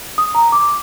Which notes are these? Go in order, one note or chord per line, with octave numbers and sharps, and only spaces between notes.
D#6
A#5
D6